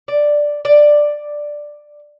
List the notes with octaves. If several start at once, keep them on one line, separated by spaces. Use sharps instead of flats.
D5
D5